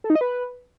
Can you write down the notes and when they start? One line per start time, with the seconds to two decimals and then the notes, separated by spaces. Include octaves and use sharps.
0.04 A4
0.10 D#4
0.15 D#5
0.21 B4